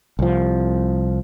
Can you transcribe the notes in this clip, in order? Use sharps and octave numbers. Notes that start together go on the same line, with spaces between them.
C2 F3